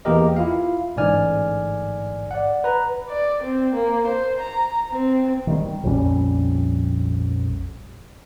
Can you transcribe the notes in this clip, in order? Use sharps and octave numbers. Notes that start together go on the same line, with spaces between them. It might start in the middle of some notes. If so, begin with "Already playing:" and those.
E2 E3 A#3 G4 A#4 D#5
E4 F4 F5
A1 G#2 D3 D5 G#5 F6
D5 F#5
B4 A#5
D5
C4
A#3
C5
A#5
C4
D#3 G3
A#1 F2 G3 C#4